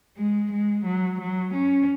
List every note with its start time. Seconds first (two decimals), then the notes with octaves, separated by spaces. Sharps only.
0.17 G#3
0.51 G#3
0.85 F#3
1.19 F#3
1.54 C#4